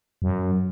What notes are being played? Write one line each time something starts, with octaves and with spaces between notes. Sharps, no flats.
F#2